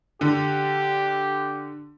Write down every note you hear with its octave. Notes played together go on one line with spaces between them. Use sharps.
D3 G4